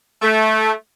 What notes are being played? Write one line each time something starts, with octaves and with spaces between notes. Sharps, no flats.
A3